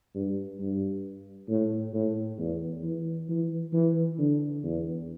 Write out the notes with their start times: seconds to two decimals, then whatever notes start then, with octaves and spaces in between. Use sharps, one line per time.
0.15 G2
0.59 G2
1.49 A2
1.93 A2
2.38 E2
2.83 E3
3.29 E3
3.73 E3
4.19 D3
4.64 E2